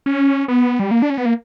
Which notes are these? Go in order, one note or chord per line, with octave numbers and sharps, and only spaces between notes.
C#4
B3
G3
A#3
D4
C#4
B3
A#3